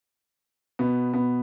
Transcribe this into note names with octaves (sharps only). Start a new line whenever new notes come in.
B2 B3
B2 B3